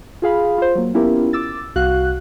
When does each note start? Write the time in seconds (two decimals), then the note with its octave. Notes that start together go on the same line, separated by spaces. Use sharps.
0.22 F4 G#4 F5 B5
0.58 F4 C5
0.75 F#3 A#3
0.94 B3 C#4 E4 F4 G4 A#4
1.33 D6 E6 A6
1.76 C2 F#4 F5 F#6